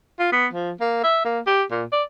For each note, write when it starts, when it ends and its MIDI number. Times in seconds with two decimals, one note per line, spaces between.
0.19 0.29 65
0.32 0.47 59
0.54 0.71 53
0.81 1.02 58
1.04 1.21 76
1.25 1.40 58
1.47 1.63 67
1.71 1.84 46
1.92 2.03 74